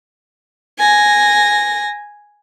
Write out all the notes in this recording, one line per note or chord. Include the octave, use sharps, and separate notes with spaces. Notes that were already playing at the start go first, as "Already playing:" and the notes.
G#5 A#6